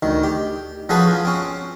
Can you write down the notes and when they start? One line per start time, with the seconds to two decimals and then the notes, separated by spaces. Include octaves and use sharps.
0.03 D2 D#3
0.23 G4
0.89 F3 C#4 F#4 G#4 A4 B4
1.08 F4
1.25 C4 C#4